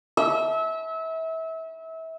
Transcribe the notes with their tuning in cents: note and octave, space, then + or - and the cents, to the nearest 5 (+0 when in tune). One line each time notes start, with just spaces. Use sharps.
E5 -30